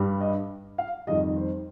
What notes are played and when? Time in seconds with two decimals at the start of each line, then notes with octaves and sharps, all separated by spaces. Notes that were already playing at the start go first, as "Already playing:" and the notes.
Already playing: G2 G3
0.21 D#5
0.78 F5
1.07 F2 D#3 G3 D#5
1.37 C5